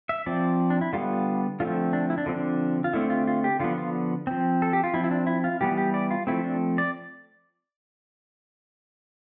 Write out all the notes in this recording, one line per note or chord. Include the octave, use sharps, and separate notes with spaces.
E5
F3 C4 D5
D4
E4
D3 G3 B3 F4
D3 F3 A3 C4 F4
D4
E4
D4
D3 F3 C4
D4
F4
D3 A3 C4 E4
F4
F4
G4
D3 F3 B3 F4
F4
F3 C4
A4
G4
F4
F3 C4 E4
E4
D4
E4
F4
E3 G3 B3 G4
G4
D5
F4
F3 A3 C4 E4
D4
D5